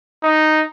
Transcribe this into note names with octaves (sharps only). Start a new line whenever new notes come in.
D#4